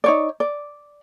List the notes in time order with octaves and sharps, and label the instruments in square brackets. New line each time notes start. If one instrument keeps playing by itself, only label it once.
[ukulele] D#4 C#5 D5
D5